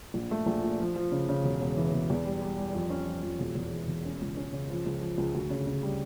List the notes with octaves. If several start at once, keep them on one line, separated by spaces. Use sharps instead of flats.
A#1
A3
A#1
A#2
F3
F3
C#3
C#3
E1
E1
E3
E1
E2
G3
G3
G3
F2
C#4
F3
F2
E1
E2
E3
E1
C#4
C#2
C#4
C#3
F3
C#2
F3
C#2
D2
C#3
C#3
G3